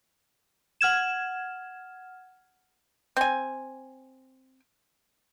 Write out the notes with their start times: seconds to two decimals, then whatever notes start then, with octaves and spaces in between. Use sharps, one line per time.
0.81 F#5 F6 G#6 E7
3.17 C4 G#5